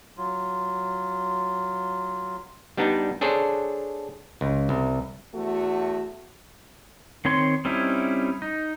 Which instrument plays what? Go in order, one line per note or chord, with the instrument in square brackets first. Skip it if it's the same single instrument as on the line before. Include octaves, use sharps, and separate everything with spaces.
[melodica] F#3 F4
[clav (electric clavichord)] G3 B3 D4 D#4
D4 G#4 A4 C5 C#5
C#2
C2
[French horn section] E2 A3 F#4
[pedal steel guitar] D#3 C4 C#5 C6
G3 C4 C#4 D#4 E4
D#4